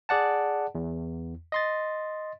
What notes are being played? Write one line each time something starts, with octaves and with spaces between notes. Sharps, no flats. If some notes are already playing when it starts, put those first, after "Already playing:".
G#4 D5 F#5 A5
E2
D#5 C6 A6